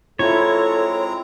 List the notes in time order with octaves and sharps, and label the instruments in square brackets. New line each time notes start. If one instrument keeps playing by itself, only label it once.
[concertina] G#3 C4 A#5 [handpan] E4 F4 [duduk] A4 [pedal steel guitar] C#5